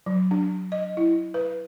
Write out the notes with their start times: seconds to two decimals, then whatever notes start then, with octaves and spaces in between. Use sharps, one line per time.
0.06 F#3
0.31 D4
0.72 D#5
0.97 E4
1.34 B4